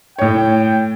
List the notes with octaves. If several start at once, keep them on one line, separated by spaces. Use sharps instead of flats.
A2 C#5 G5